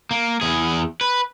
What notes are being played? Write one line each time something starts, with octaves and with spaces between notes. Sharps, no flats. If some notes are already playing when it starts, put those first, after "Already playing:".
A#3
E2 G#4
B4